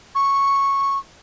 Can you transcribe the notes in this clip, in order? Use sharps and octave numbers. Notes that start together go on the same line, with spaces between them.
C#6